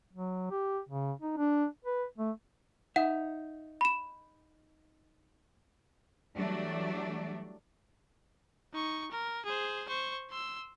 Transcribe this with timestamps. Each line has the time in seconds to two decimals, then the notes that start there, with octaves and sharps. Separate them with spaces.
0.13 F#3
0.51 G4
0.89 C#3
1.22 D#4
1.37 D4
1.85 B4
2.18 A3
2.96 D#4 E5 F#5
3.81 B5 E7
6.36 E3 F#3 G3 A3 D4
8.73 D#4 C#6
9.12 A#4
9.45 G#4 C5
9.88 C5 C#6
10.30 C6 E6